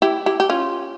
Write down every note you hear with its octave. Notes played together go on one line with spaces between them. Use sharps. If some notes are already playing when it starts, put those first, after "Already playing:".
E4 G4
E4 G4
G4
C#4 F4